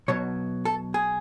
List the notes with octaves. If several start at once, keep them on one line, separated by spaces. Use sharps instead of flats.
B1 B2 F#3 C#5
A4
G#4